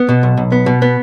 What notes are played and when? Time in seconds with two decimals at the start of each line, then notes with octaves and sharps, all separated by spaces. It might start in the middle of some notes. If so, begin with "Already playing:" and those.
Already playing: B3
0.09 B2
0.23 B1
0.37 B1
0.52 B3
0.66 B2
0.82 B3